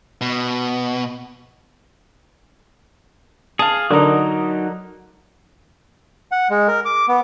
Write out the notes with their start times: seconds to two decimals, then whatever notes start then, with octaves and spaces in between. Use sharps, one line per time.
0.21 B2
3.59 G#4 F5 A5
3.90 D3 F#3 D#4 A#4
6.32 F#5
6.50 G#3
6.68 A#4
6.85 D6
7.08 B3